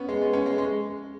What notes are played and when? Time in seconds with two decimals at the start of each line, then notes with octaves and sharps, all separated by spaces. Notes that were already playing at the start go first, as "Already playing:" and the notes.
Already playing: B3 C#4
0.09 G#3
0.21 B3
0.33 C#4
0.46 G#3
0.58 G#3